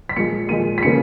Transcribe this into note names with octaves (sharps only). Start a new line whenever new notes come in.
B6
A#2 F3 G#3 C#7
A#2 F3 G#3 D#7
B6
C#3 F3 A#3 C#7